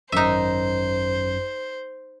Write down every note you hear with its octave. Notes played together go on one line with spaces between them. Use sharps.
G#1 F#2 D#4 C5 E5